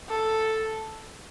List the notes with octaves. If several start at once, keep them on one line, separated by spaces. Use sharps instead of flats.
A4